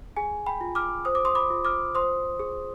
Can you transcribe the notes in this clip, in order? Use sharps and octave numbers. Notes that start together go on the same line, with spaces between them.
G#4 G#5
G5 B5
F4
D6 F6
C5 D#6
D6
C6 D#6
B5 D6
F4
D6 F6
C5 C6 D#6
G#4